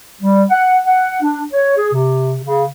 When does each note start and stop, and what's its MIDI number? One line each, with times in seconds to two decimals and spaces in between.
0.22 0.44 55
0.50 0.78 78
0.85 1.18 78
1.22 1.43 62
1.53 1.74 73
1.77 1.93 68
1.94 2.38 48
2.43 2.64 49